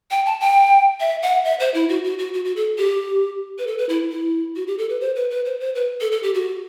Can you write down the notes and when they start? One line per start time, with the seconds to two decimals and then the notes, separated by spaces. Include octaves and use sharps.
0.11 G5
0.26 A5
0.41 G5
1.00 E5
1.22 F#5
1.45 E5
1.60 C5
1.74 E4
1.89 F#4
2.04 F#4
2.19 F#4
2.34 F#4
2.45 F#4
2.56 A4
2.78 G4
3.59 B4
3.67 A4
3.78 B4
3.89 E4
4.11 E4
4.56 F#4
4.67 G4
4.78 A4
4.89 B4
5.01 C5
5.16 B4
5.30 B4
5.45 C5
5.60 C5
5.75 B4
6.01 A4
6.12 A4
6.23 G4
6.34 F#4